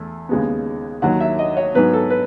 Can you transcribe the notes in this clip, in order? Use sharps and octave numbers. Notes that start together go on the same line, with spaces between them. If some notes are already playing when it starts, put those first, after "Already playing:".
Already playing: E2 A3
D#2 C#3 G#3 B3
D#2 D#3 F#3 F#5
E5
D#5
C#5
G#2 F#3 B3 B4
A4
B4